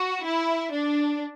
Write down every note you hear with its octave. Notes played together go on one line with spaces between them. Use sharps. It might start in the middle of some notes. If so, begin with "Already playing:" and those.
Already playing: F#4
E4
D4